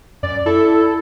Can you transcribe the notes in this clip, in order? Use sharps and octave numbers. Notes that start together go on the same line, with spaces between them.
F#2 D5
E4 A4